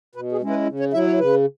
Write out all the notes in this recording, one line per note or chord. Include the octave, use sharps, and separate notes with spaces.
B2 B4
G#4
G#3 C#4 E4
B4
C#3
C#5
F#3 E4 E5
C#5
C#3 B4